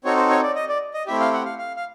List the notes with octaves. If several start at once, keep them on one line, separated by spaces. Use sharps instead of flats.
C4 D#4 F#4 A4 C#5
C5
C#5
D5
D#5
D5
D#5
A3 C4 E4 G4 E5
F5
F#5
F5
F5
F5